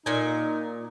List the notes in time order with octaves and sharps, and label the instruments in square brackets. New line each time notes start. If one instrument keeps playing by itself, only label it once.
[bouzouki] A#2 G#5 [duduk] D#4